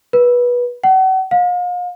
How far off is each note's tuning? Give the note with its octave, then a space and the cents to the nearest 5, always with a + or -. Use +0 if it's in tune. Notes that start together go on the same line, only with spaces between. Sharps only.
B4 -20
F#5 +40
F5 +40